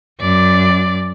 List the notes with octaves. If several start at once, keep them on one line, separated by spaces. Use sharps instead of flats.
F#2 D5